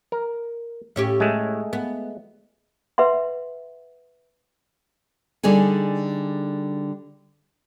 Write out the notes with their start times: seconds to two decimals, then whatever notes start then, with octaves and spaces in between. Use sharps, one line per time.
0.12 A#4
0.96 A2 C#4 G4
1.20 G#3 A3
1.73 B3
2.98 B4 E5 F#5 C6
5.43 D3 G3 D#4 G#4 G#5